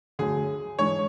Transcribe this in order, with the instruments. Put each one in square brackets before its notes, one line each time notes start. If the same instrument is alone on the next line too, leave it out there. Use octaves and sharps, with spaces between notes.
[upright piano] D2 D3 F#3 [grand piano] G#4
[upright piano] G#2 E3 G#3 D4 [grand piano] C#5